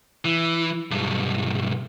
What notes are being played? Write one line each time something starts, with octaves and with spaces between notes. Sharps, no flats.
E3
B1 G2